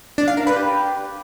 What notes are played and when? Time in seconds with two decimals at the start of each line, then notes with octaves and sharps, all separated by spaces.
0.18 D4
0.28 F5
0.37 A#4
0.47 B4
0.56 G4